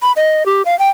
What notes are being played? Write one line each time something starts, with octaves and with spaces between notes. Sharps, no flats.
B5
D#5
G4
F5
G5